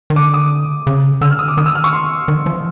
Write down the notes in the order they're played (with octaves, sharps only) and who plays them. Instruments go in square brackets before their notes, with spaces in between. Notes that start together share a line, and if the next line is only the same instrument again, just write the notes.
[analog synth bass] D#3
[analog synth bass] D3 [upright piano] D6
[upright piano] D#6
[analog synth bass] C#3
[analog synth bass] D3 [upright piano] E6
[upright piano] F6
D#6
D6
[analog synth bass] D#3 [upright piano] D#6
[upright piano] E6
F6
C#6
C6
[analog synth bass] D#3
E3
F3
E3